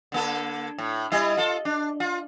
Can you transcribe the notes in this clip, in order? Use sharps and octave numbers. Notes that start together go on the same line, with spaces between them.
D3 A#3 A4
A2
G3 E4 D#5
F4 A4
D4
F4